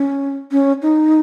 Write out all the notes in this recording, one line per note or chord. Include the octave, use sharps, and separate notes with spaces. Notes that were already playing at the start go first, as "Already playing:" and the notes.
Already playing: C#4
C#4
D#4